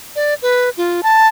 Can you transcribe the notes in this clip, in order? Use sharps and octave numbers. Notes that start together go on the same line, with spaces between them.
D5
B4
F4
A5